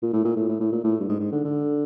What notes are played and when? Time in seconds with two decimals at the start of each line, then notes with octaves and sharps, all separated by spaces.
0.02 A#2
0.13 A2
0.25 A#2
0.37 A2
0.49 A2
0.60 A2
0.72 A#2
0.84 A2
1.00 G2
1.09 G#2
1.20 G#2
1.32 D3
1.44 D3